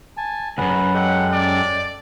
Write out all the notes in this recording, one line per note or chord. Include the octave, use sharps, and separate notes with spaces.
G#5 A5
C#2 F#2 G#4 B4 F#5
G#3 G4 A4 F#5
D5